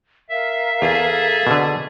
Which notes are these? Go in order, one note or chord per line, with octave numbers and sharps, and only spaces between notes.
A#4 E5 F5
E2 G#4 A4 A5
B2 D3